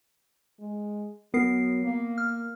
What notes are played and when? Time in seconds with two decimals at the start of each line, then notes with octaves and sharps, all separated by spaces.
0.60 G#3
1.34 F#3 B3 A#4 C7
1.83 A#3
2.18 F6